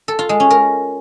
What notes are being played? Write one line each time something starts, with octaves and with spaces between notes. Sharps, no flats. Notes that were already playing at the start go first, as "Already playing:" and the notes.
A4
F4
G#3
C#4
A#4